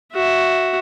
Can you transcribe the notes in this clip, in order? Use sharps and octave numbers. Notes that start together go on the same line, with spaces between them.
F#4 E5